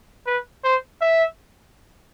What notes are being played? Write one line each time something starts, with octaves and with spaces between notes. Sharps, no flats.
B4
C5
E5